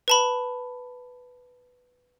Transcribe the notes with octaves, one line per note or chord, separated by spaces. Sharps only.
B4 A5 B5